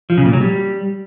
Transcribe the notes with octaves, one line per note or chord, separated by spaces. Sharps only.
F3
C#3
A#2
F#3
G3